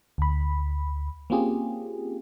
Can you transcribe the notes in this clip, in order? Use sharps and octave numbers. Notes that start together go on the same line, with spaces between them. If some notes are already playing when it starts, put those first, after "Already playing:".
D2 B5
A#3 C4 C#4 F4 G4 G#4